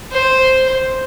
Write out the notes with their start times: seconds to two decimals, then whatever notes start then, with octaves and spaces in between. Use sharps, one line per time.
0.12 C5